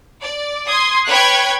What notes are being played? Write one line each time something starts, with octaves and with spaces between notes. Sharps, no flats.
D5
C6 D#6 G#6
B4 C#5 G5 B5 F#6 G#6